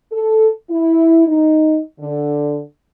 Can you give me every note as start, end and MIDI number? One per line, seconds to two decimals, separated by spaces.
0.12 0.47 69
0.70 1.25 64
1.27 1.80 63
2.00 2.60 50